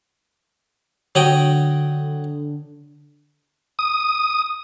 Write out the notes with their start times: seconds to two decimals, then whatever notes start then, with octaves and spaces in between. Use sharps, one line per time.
1.15 D3 F#3 D#5 G5
3.79 D#6